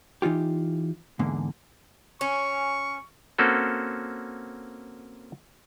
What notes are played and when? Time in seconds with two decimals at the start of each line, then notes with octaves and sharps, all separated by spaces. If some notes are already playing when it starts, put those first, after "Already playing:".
0.22 E3 D#4 F4 G4
1.19 E2 G#2 D3 A#3
2.21 C#4 C#6
3.38 A#3 C4 C#4 F#4 A4